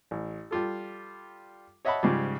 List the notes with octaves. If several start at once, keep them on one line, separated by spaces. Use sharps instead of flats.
A1
G3 F4 A4
C#5 D#5 E5 F#5 A5 B5
G#2 C#3 F3 G3